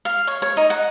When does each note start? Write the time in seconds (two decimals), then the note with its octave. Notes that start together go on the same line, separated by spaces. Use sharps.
0.05 F5
0.27 C#5
0.42 C#5
0.57 D#4
0.70 F#5